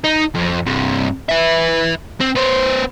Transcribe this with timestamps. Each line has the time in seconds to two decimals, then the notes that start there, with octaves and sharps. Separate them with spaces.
0.04 D#4
0.35 F2
0.66 G2 C3
1.29 B4 E5
2.20 C4
2.36 B3 C5